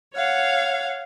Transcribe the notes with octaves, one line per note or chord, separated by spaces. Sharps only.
C#5 F5 F#5